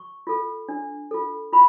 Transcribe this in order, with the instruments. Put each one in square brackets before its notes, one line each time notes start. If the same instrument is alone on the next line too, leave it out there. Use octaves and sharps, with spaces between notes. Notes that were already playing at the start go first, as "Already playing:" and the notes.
Already playing: [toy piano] C#6
F4 A4
D4
F4 A4
F4 B5